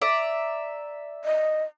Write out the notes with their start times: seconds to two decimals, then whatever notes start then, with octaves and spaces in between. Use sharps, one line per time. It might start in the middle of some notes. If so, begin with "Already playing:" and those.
0.02 D5 E5 A#5
1.25 D#5